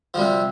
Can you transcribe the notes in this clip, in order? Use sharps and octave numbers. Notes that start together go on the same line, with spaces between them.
C3 F3 G3